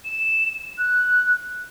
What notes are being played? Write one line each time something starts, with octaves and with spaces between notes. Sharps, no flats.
E7
F#6